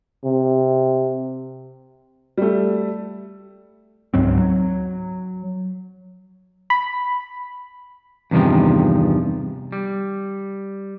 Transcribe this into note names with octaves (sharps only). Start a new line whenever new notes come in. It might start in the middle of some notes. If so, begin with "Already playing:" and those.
C3
G3 A3
C#2 G#2 F#3 C4
F#3
B5
E2 G2 C3 D#3 F3
G3